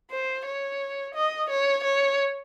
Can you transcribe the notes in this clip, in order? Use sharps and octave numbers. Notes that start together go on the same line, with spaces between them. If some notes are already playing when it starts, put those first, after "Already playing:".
C5
C#5
D#5
C#5
C#5